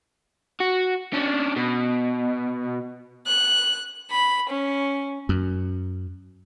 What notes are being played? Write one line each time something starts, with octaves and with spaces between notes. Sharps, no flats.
F#4
C#4 D4
B2
F#6
B5
C#4
F#2